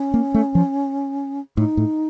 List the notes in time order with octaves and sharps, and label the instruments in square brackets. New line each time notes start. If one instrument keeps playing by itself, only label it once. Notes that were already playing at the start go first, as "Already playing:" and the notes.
Already playing: [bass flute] C#4
[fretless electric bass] A#3
A3
F3
[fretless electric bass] A2 [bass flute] D#4
[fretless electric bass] A2